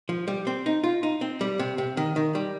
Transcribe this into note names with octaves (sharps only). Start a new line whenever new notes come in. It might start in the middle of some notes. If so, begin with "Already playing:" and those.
F3
G3
C4
D#4
F4
D#4
C4
G3
C3
C3
D#3
D#3
G3